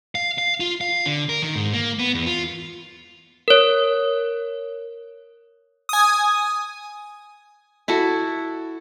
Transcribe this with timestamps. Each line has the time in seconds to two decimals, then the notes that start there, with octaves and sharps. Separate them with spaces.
0.15 F5
0.38 F5
0.60 F4
0.81 F5
1.06 D3
1.29 A#4
1.42 D#3
1.55 G#2
1.74 A#3
1.99 B3
2.15 E2
2.26 F4
3.48 A#4 C#5
5.89 G#5 D#6
7.88 E4 F#4 A4